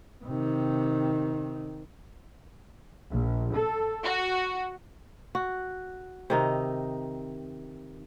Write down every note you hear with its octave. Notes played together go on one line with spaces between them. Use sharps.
C3 D#3
A#1
A4
F#4
F#4
C3 D#3 D#4